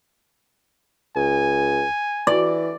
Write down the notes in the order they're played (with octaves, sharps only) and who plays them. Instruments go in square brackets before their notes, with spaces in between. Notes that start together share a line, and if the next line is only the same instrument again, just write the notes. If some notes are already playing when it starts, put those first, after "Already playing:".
[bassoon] C#2 [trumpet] G#5
[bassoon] E3 [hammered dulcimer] D5